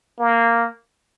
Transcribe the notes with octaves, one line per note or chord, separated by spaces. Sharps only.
A#3